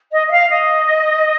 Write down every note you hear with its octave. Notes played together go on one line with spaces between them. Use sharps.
D#5
D#5
F5
D#5